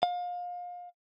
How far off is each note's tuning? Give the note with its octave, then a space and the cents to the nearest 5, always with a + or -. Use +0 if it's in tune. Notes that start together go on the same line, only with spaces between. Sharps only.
F5 +30